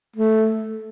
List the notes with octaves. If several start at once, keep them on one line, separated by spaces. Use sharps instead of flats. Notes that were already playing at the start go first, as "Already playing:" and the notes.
A3